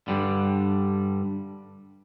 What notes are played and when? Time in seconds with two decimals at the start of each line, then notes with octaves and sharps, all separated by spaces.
0.08 G2 D3 G3